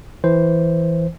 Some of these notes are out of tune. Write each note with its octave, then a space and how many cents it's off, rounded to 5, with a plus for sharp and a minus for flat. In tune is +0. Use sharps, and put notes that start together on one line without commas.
E3 +0 C5 +0